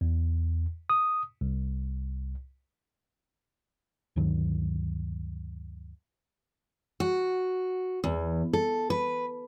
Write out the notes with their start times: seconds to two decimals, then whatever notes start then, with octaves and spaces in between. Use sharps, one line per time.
0.01 E2
0.90 D#6
1.41 C2
4.16 D2 G2 D#3 F#3
7.00 F#4
8.04 E2
8.53 A4
8.90 B4